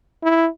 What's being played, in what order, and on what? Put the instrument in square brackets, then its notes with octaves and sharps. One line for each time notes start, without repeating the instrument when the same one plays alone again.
[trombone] E4